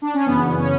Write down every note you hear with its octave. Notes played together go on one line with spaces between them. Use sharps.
D4
C#4
F#2 C#3 E3 B3
C#4